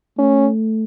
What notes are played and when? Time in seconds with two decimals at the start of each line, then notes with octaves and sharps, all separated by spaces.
0.18 A3 C#4